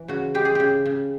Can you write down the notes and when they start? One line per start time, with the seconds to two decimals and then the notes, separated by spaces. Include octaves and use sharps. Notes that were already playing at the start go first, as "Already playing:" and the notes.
Already playing: E3
0.08 C#3 F#4
0.34 G#3 G4
0.45 G#4
0.55 C#3 G4
0.86 C#3